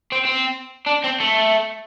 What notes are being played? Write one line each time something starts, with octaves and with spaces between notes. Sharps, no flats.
C4
C4
D4
C4
A3